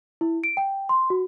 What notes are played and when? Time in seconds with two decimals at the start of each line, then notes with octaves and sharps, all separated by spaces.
0.21 E4
0.44 D7
0.57 G5
0.89 C6
1.10 F#4